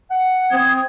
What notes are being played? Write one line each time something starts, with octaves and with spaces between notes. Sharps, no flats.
F#5
C4 D#6 G#6